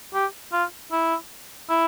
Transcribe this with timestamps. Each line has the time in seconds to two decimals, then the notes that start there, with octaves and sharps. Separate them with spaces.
0.14 G4
0.52 F4
0.92 E4
1.69 E4